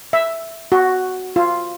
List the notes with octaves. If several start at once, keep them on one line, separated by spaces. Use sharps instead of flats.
E5
F#4
F4